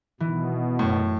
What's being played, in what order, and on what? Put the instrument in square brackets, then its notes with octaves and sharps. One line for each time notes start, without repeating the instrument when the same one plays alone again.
[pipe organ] B2 [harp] E3
[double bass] F#2 [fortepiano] A2